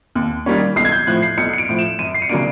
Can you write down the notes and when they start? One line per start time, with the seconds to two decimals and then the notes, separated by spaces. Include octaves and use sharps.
0.15 D#2
0.46 D#3 G3 A#3 C#4
0.76 B1 C7
0.85 G#6
0.92 G6
1.07 A2 F3 F#6
1.22 C7
1.38 B1 C#7
1.53 C#7
1.58 D7
1.69 A2 F3
1.79 E7
1.99 F#2 D#7
2.14 C7
2.22 C#7
2.29 C#3 F#3 A#3 D4 D7